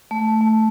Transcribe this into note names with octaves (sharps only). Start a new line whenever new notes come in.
A3
A3